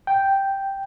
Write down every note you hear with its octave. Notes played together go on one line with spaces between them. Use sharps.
G5